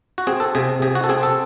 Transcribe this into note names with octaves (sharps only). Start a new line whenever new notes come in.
F#4
C4 G#4
A4
C3 G#4
C3 G#4
F#4
A4
C4 G#4
A4